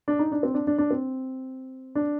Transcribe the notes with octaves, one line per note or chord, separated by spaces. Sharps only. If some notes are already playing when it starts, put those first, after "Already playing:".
D4
D#4
D4
C4
D4
D4
D4
C4
D4